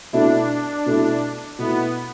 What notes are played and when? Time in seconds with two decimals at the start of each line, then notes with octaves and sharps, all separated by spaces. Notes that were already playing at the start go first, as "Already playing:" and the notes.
0.13 B2 A3 D4 E4
0.86 B2 A3 E4
1.58 B2 A3 B3 E4